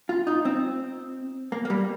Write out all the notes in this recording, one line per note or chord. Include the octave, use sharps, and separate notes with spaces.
F4
D#4
C4
A#3
A#3
G3